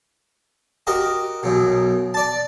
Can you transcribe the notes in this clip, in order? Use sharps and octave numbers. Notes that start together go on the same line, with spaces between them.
F#4 G4 A#4 D#5
B1 F#2 B2
D5 A5